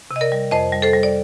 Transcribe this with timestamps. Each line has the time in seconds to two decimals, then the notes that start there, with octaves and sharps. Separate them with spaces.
0.11 C3
0.16 D#5
0.21 A#4 D5
0.32 G3
0.51 F2 C5 D#5
0.72 G3
0.82 A4 C5
0.93 G3
1.03 D5